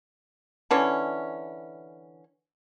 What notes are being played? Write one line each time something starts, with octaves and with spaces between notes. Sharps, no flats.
D3 E3 C#4